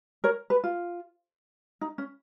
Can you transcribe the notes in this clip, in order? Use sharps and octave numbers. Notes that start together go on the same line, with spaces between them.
A#4 C#5
B4
F4
D#4
C#4